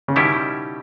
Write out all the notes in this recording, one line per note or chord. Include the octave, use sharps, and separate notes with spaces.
C#3
B2 D#3 G3 C#4 E4 G4